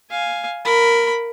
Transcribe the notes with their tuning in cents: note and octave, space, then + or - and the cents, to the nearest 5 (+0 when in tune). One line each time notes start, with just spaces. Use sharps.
F5 +0 G#5 +0
A#4 +0 B5 +10